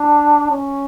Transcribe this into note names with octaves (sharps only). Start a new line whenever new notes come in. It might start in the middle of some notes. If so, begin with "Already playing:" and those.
Already playing: D4
C#4